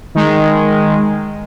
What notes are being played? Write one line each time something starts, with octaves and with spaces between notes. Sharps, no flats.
D#3 G#3